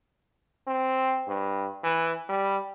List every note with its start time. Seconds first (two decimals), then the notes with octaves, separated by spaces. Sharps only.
0.67 C4
1.27 G2
1.83 E3
2.29 G3